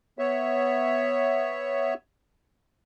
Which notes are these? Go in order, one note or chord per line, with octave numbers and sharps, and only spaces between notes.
B3 C#5 E5